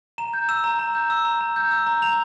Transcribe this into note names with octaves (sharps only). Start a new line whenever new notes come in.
A#5 E7
G6
E6 E7
A#5
A#5
G6
E6
A#5
A#5
G6
E6
A#5
A#5 F7